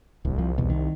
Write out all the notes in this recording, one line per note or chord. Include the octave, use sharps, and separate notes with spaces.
D1 C2
F3
B1 E2 B2
D#3